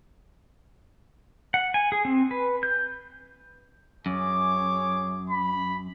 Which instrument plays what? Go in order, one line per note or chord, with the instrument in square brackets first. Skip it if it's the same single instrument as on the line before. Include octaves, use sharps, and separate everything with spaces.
[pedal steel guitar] F#5
G#5
G#4
C4
B4
G6
[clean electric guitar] F#2 [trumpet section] G#4 C#5 D6
[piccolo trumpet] B5